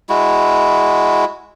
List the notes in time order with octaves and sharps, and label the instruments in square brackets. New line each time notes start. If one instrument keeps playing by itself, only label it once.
[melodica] G#3 E4 F#4